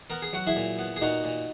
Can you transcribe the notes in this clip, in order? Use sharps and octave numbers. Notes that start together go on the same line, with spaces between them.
B3 A#4
G#4
F#3 F#4
E4 G#4
A#2
B3
G#4
A#2 D#4 F#4
A#2